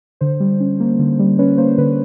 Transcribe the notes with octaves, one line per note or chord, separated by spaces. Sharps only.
D3 C5
G3
C#4
A#3
D3
G3
C#4 B4 C#5
A#3 C5
D3 B4